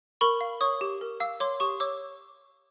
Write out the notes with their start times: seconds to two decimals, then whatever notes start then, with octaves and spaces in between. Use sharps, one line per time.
0.21 A#4 B5 C#6
0.41 F5
0.61 C#5 C#6 D#6
0.81 G4
1.01 A#4
1.20 F5 D6 E6
1.40 C#5 C6 D6
1.60 G4 C#6 D#6
1.80 C#5 D6 E6